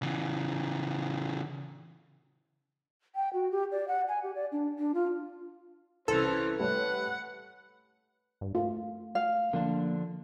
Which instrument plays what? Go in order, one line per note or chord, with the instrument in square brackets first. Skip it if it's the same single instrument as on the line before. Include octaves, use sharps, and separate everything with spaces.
[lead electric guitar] C#3 E3
[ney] G5
F#4
G4
D5
F#5
G#5
G4
D5
D4
D4
F4
[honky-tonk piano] C2 [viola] E3 C#4 [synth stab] A4 [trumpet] C5
[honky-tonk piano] G3 A3 C#5 [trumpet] B4 [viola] F#5
[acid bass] G2
[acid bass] A3 [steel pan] F4
[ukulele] F5
[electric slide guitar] D3 F3 D4 [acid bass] A#3